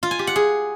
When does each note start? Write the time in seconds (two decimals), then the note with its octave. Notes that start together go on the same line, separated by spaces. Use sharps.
0.03 F4
0.11 G#5
0.19 G4
0.27 F#5
0.36 G#4